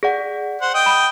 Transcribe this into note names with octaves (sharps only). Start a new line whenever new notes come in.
G#4 D5 F#5
C5 F#5
D#5 G5
B5